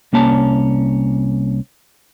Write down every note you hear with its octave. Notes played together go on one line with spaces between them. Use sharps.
C2 A#3 C#4 A5